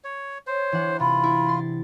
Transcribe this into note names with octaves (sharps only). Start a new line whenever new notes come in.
C#5
C5 C#5
E3 D4 F#5
C3 F4 B5
E4
C6 A6